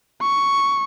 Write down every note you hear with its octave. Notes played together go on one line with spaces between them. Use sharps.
C#6